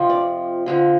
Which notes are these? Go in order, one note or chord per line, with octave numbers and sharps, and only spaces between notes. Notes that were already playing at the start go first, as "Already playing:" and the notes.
Already playing: F2 C3 F3
D5
F2 D3 F3